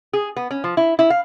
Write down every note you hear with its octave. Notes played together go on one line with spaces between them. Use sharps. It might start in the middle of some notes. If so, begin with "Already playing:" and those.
G#4
B3
C#4
F3
E4
E4
F5